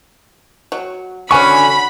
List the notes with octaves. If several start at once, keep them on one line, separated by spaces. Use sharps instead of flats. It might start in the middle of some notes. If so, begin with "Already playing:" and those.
F#3
D3 C#4 F#4 G#5 B5 C#6